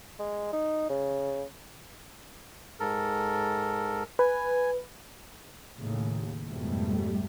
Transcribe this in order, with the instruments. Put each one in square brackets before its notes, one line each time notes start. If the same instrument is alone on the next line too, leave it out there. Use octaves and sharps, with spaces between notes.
[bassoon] G#3
D#4
C#3
[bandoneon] G#2 A4 A#4
[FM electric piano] B4 [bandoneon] G#5
[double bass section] D#2 A2 C#3
F2 G#2 B2 G3 A3